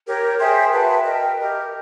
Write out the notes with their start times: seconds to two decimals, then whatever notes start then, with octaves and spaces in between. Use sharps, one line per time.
0.06 G4 A#4 C#5
0.39 G#4 C5 E5 G5
0.71 F#4 B4 E5 A5
1.05 A#4 D#5 G5
1.37 G4 A#4 D#5